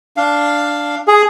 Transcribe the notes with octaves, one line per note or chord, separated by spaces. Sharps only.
D4 F5
G#4